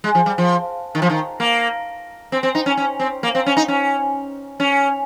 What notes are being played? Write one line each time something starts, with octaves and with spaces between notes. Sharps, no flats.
G#3
F3
G3
F3
D#3
F3
D#3
A#3
C4
C4
D#4
C#4
C#4
C4
A#3
C4
C#4
D#4
C#4
C#4